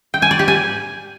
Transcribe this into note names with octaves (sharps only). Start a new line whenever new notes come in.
G5
G#5
D5
G4
G#5